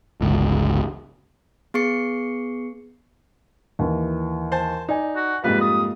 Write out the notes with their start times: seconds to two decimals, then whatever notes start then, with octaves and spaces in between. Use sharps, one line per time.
0.21 G1 C#2
1.74 B3 G#4 C#6 C7 C#7
3.79 D#2 E3
4.52 C5 G#5 A5
4.89 D#4 D5 D#5 G#5
5.16 F#4
5.44 F2 G#2 G3 A#3 F4 B4 F5
5.61 D#6